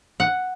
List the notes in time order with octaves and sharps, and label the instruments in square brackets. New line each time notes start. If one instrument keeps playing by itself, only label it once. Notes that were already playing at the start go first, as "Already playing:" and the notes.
[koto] F#5